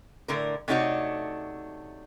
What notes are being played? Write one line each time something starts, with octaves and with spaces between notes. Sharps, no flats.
A2 D3 A#4
C3 A3 D4 D#4 F#4 C#5